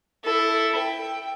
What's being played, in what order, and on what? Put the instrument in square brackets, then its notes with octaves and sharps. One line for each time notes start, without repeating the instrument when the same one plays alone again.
[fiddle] E4 A4
G5